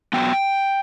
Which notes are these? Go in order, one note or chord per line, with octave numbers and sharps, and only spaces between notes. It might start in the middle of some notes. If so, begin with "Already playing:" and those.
B2 F#3 B3 G5